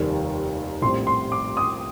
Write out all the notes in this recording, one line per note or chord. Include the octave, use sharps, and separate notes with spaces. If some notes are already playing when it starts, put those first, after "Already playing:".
Already playing: F1 D#2 D#3 G3
A#1 A2 G3 C4 C6
C6
D6
D#6